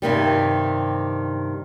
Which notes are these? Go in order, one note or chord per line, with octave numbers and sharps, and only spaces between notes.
G2 C3 D#3 G3